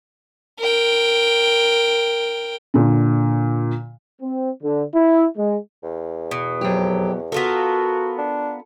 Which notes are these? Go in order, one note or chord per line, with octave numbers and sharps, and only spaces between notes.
A#4 G5
A#2 D3
C4
D3
E4
G#3
E2
B2
F2 F#3 G4
B3 F4 F#4 A4 A#4
D4